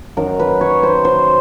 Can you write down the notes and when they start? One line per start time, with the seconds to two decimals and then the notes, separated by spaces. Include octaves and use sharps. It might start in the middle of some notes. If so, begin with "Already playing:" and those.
0.17 F#2 D#3 F#3 A#4
0.39 B4
0.61 C#5
0.83 C5
1.05 C5